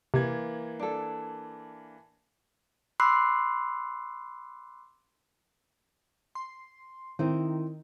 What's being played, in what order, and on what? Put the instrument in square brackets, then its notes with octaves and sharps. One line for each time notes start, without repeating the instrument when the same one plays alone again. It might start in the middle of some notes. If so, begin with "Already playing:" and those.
[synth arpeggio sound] C3 [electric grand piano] E3 A#3 G#6
[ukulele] D4 A4
[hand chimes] B5 C6 D6 E6 F#6 C7
[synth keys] C6
[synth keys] D#3 [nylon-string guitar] C4 E4 C5